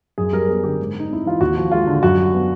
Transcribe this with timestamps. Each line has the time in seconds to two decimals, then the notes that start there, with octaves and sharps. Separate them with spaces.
0.18 F#2 G#4
0.33 G3 A#4
0.48 B3 G#4
0.64 D3 G4
0.80 G#2
0.94 G#3
0.99 D#4
1.10 C4 E4
1.26 E3 F4
1.41 D#2 F#4
1.56 F3
1.72 G#3 F4
1.87 D3
2.03 F#2 F#4
2.19 G3
2.33 B3